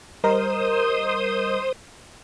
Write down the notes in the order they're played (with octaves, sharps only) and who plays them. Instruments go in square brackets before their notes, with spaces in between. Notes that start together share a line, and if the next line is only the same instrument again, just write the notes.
[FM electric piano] G3 A#4 D#5 [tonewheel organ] C5 D#6